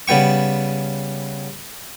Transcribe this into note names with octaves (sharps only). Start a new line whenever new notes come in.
C#3 G3 B3 G5 C#6